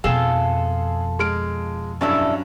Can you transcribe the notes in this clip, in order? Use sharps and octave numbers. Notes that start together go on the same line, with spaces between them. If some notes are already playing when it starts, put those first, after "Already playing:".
F2 B2 F4 G#4 A4 F5 E7
G#3 F6 D7
G2 F#3 C#4 D4 E4 A4